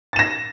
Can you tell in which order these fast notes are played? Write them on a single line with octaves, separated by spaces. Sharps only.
A6 E7 A#6